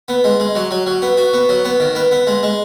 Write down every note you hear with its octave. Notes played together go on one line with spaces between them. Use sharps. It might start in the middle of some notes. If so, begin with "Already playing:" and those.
B3
G#3
G#3
F#3
F#3
F#3
B3
F#4
B3
F#3
B3
D#3
B3
B3
G#3
G#3